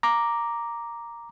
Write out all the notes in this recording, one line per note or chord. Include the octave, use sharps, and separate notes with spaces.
A#5 D6